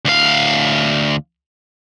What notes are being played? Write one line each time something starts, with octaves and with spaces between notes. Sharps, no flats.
D2 F5